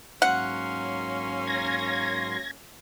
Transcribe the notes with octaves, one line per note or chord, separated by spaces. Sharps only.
G#2 F#3 A#3 C#4 F#5 C6
G#6 A#6